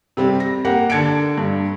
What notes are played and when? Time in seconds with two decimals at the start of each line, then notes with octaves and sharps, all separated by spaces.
0.17 C3 G3 C4
0.40 A#6
0.65 A#3 G4 F#5
0.90 D3 A5 G#6 C#7 D7
1.38 G2